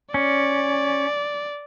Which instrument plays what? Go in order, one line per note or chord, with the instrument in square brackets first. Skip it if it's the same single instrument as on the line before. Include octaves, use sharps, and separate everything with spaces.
[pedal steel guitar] C#4 [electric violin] D5